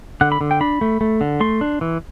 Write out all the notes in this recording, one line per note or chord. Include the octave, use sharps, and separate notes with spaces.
D3 F#5
B5
D3
G5
D4 B5
A3
A3
D3
A3 C6
D4
E3